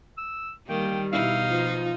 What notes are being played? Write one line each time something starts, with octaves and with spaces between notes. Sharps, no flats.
E6
D#3 G3 A#3 G5
B2 D#4 E4 F5
F3 F4